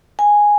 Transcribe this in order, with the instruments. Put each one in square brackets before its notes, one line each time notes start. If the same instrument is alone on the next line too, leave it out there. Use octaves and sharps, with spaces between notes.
[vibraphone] G#5